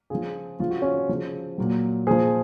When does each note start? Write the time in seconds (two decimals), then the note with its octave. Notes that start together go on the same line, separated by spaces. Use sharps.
0.10 C#3 F3 F4 G#4
0.59 C#3 F3 F4
0.70 F#4
0.82 C#4 F4
1.09 C#3 F3
1.58 A#2 F#3
2.07 A#2 F3 G#4 C5